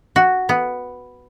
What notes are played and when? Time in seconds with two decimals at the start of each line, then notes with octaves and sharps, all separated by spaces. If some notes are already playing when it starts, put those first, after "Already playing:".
0.16 F#4
0.49 B3